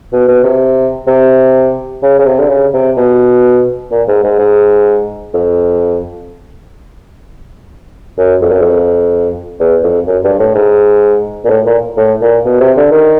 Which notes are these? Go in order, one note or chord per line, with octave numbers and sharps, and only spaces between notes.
B2
B2
C3
C3
C#3
C#3
C3
D3
C#3
C3
B2
A#2
G#2
G#2
G#2
F2
F#2
F2
F#2
F2
E2
F2
F#2
G2
A2
G#2
A#2
A2
A#2
A2
A#2
B2
C3
D3
D#3